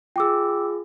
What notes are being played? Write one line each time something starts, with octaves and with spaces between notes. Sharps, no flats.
F4 G#4 G5 D6 E6